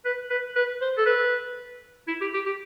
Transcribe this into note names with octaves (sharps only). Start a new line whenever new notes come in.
B4
B4
B4
C5
A4
B4
E4
G4
G4
G4